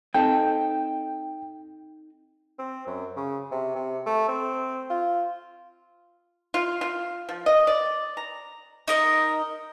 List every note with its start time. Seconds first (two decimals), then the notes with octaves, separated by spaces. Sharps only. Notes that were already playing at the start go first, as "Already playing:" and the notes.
0.14 C4 D#4 A4 G5
2.59 C4
2.87 F#2
3.17 C#3
3.51 C3
3.76 C3
4.06 A3
4.28 C4
4.90 F4
6.54 F4
6.81 F4
7.29 F3
7.46 D#5
7.67 D5
8.17 A#5
8.88 D#4 A#4 D#5